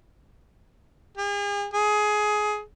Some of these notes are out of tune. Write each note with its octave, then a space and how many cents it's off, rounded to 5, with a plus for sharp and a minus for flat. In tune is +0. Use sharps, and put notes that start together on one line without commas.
G#4 -40
G#4 +20